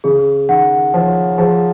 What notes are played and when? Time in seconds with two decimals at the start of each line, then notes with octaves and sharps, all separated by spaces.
0.04 C#3 G#4
0.49 D#3 F#5
0.94 F3 C#5
1.38 F3 G#4